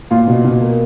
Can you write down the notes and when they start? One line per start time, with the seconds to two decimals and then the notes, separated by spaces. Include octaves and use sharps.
0.11 A#2 F4
0.28 B2
0.45 B2
0.61 A#3